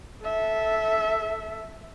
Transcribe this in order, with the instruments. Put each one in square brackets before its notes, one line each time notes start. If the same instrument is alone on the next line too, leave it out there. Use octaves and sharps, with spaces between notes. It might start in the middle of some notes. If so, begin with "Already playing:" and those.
[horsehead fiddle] A4 E5